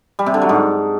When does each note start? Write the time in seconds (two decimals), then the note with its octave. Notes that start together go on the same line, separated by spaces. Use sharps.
0.19 G3
0.26 C3
0.34 D3
0.42 F#3
0.49 G#2